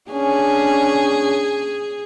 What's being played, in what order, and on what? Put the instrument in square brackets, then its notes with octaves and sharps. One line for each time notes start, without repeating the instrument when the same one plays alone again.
[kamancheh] C#4 D4 [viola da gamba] G#4